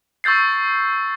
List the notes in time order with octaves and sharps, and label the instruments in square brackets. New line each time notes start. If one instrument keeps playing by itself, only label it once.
[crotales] C#6 E6 G6 A6 C7